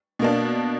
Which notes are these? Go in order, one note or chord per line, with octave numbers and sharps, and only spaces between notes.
B2 A#3 D4